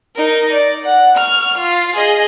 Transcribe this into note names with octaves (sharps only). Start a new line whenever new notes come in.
D#4 A#4
D5
F#5
C#6 F6
F4
G#4 D#5